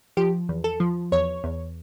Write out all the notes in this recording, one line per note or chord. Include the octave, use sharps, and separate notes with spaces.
F3 G4
E2
A4
F3
E2 C#5
E2